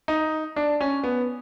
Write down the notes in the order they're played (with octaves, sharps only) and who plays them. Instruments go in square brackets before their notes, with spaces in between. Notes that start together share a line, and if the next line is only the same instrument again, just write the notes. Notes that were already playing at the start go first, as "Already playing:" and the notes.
[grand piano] D#4
D4
C#4
B3